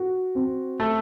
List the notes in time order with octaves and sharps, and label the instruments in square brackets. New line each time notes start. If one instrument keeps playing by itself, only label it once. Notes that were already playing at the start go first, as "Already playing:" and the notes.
Already playing: [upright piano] F#4
C4
[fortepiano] A3